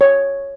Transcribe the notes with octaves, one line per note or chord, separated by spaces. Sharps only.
C#5